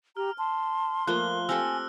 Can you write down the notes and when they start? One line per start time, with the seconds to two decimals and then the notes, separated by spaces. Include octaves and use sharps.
0.17 G4 A#5 F6
0.38 A5 C6
1.07 F3 A3 A#3 A#4 F#6 G7
1.49 C4 G4 A4 G#5 E6 F6 A#6